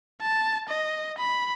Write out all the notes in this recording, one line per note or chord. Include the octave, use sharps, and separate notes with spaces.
A5
D#5
B5